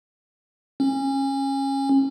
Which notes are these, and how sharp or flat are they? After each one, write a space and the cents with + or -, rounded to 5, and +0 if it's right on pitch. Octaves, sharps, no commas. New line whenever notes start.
C#4 -25